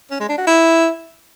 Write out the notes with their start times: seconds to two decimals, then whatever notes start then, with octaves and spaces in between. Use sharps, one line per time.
0.11 C#4
0.20 G#3
0.29 D4
0.38 F#4
0.47 E4